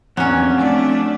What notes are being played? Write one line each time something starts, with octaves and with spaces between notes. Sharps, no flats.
E2 F3 F#3 C4 C#4 F#5
A3 D4